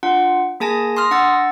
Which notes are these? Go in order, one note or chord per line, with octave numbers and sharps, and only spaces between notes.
D4 F4 F#5
A#3 G#4 G#5 A5 A#6
C6 D#6 F6 A#6
D4 F#5 E6 A6